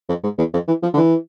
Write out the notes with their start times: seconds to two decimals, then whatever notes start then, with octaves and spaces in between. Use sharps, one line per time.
0.09 F2
0.24 G#2
0.38 E2
0.54 F2
0.68 E3
0.83 F3
0.94 D3
0.97 E3